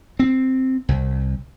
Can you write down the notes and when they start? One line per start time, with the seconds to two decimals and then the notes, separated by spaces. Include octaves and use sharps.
0.19 C4
0.89 C2